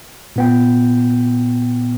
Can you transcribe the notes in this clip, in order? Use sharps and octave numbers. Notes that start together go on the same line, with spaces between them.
A#2 B3 G5